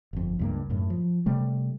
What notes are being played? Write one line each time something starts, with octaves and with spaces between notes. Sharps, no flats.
G1 F2
C#2 G2 A#3
F#2 A2
F3
C3 G3 A3